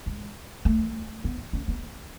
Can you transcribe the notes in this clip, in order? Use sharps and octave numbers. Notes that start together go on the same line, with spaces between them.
G#3
A3
B3
C#4
B3